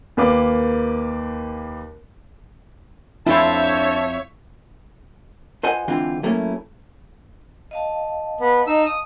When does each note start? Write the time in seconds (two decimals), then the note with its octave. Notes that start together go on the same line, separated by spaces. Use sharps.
0.17 D#2 A#3 B4 F5 D6
3.27 F2 D4 E4 A4 C5 C#5 E5 A5
5.63 F4 B4 C5 D#5 F#5 G#5
5.88 D3 E3 G#3 C4 F4
6.23 F#3 A3 A#3 C#4 E4
7.71 D#5 F5 A5
8.40 B3
8.67 D#4 E6
8.86 D#6